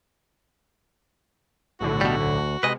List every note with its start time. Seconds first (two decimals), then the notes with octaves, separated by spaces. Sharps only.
1.80 B1 A2 D3 F#4
2.01 B2 G3
2.21 D2
2.63 C3 G#3 B4 D#5